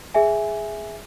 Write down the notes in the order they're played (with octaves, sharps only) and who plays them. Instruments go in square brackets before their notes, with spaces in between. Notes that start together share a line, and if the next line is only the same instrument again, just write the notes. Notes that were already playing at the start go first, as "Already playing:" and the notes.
[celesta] G#4 E5 G#5